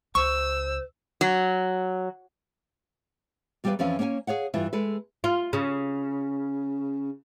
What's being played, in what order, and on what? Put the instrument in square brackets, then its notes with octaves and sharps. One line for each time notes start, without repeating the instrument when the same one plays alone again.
[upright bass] C#2 [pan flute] C5 [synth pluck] C#6 [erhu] E6
[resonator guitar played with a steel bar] F#3
[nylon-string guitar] E2 G3 G4 A4 B4 F5
F2 E3 F3 C#4 F5
A#3 C#4 C#5 G5 G#5
G#4 C#5 F5 F#5
G2 E3 E4 F4
G#3 A4 B4
[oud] F4
C#3